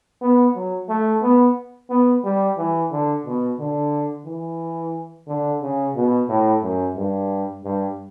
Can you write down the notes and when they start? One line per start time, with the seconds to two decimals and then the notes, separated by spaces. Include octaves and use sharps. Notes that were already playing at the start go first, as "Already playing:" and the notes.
0.22 B3
0.55 F#3
0.89 A3
1.22 B3
1.90 B3
2.24 G3
2.58 E3
2.92 D3
3.26 B2
3.59 D3
4.26 E3
5.28 D3
5.62 C#3
5.95 B2
6.29 A2
6.63 F#2
6.97 G2
7.64 G2